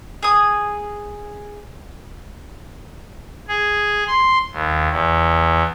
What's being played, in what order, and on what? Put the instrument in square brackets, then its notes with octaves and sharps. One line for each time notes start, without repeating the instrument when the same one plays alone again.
[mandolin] G#4 D#6
[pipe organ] G#4
C6
D#2
E2